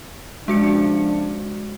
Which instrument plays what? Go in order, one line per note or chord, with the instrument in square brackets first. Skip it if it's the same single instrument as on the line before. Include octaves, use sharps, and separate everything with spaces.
[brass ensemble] C#3 F3 D4 [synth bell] G#3 F#4 C#7